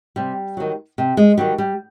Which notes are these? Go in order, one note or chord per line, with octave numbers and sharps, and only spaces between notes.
C3 G3
D#3 F#3
C3
G#3
D#3 F#3 G3
G3